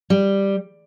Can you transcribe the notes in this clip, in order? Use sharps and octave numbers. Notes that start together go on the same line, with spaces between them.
G3